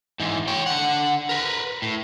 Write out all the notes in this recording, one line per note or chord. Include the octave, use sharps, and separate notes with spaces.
G#2 E3
C#5 G5
D3 F#5
A#4 B4
A2